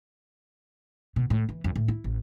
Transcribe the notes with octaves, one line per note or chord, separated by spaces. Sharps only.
B2
A2
E3
F2
A2
E4
A1